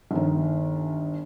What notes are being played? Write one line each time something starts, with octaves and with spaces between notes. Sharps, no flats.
G1 D#3